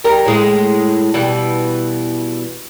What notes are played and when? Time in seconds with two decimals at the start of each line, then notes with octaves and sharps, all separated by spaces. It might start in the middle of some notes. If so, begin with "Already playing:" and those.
0.04 G3 A#4
0.26 A2 G#3
1.14 B2 E3 G3